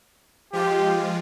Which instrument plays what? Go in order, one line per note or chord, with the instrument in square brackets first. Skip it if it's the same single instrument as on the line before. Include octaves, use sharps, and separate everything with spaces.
[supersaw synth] F3 G#3 F4 [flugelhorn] G4